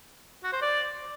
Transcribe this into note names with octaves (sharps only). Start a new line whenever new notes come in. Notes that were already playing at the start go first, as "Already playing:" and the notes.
F#4
C5
D5